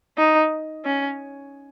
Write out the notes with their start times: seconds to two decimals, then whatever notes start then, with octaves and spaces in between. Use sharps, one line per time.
0.18 D#4
0.85 C#4